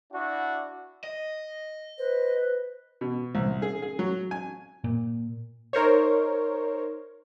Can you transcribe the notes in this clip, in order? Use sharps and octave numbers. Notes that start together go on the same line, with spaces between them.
D4 E4 F#4
D#5
B4 C5
B2
C2
G#4
G#4
F#3
G#5
A#2
D#4 A#4 C5 C#5